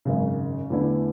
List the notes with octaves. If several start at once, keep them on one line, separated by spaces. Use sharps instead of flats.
G#1 F#2 C#3
E2 D3 A3 E4